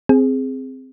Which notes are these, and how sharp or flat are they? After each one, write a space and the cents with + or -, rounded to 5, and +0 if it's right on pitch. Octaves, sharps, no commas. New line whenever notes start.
C4 -5 G#4 +0